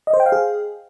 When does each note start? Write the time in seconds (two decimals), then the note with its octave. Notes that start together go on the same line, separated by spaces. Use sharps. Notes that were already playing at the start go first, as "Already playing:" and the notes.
0.07 D#5
0.13 C5
0.20 G5
0.26 F5
0.32 G#4